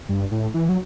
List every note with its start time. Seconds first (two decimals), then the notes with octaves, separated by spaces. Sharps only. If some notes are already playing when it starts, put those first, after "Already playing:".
0.09 G2
0.31 A2
0.54 E3
0.69 F#3